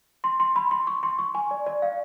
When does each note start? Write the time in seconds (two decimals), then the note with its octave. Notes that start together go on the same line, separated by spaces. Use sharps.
0.24 C6
0.40 C6
0.56 B5
0.71 C6
0.87 C#6
1.03 C6
1.19 C#6
1.35 G#5
1.51 D5
1.67 D5
1.82 F5